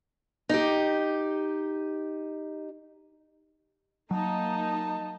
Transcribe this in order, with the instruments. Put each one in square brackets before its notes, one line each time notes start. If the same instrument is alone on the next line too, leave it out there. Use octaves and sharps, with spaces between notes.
[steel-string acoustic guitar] D#4 G4
[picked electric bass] F#3 [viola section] A#3 D#4 [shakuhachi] A5